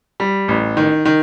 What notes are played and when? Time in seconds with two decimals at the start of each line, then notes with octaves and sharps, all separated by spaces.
0.20 G3
0.48 A1
0.77 D#3
1.05 D#3